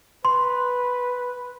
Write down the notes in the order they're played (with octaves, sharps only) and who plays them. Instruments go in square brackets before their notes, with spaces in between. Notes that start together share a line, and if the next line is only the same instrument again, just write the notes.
[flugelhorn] B4 [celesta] C6